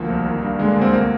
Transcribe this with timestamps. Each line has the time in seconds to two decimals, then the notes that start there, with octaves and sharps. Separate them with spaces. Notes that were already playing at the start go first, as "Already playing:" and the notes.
Already playing: D2 F3 A#3
0.09 C2
0.26 D#3
0.42 G2
0.59 D3 G#3
0.71 A#3
0.76 D2
0.81 C4
0.93 C2 A#3